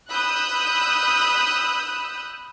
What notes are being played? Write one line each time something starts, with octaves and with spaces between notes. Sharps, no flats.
B5 D#6 E6 F#6 G6